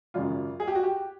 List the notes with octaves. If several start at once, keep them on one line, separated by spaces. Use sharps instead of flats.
G#1 F#2 C#3 F4
G#4
G4
F#4
G4